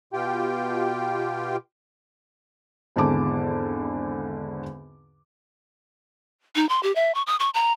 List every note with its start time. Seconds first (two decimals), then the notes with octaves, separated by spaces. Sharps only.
0.13 B2 F4 G4 G5
2.96 G#1 E2 D3 A5 D6
6.56 D#4
6.69 C6
6.83 G4
6.95 E5
7.15 C#6
7.27 D#6
7.40 C#6
7.54 A#5